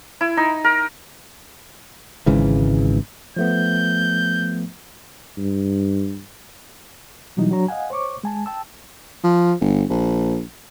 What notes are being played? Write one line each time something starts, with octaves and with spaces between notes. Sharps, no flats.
E4
D#4
A#4
G#1 G#2 C#3 E3
F3 A3 B3 G6
G2
B2 E3 F#3 G3 D#4 E4
F#3 D4 F#4 C#5 A#5
D#5 F5 F#5 G#5
C5 C#5 C#6 D6
G#3 G#5 A5
G5 A5 E6
F3
G1
A#1